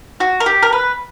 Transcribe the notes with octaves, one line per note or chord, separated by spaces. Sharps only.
F#4
A#4
G4
A#4
B4